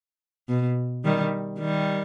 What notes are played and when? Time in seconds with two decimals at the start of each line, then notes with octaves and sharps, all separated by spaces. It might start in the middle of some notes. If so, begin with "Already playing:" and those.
0.49 B2
1.04 D#3 G3
1.59 D#3 G3